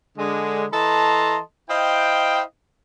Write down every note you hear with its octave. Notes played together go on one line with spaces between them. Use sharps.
D3 G#3
E3 A4 D#5 A5 A#5 C6
E4 C5 D#5 F5 G5